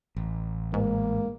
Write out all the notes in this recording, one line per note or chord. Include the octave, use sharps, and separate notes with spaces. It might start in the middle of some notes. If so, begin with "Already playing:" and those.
A1
G#2 A#3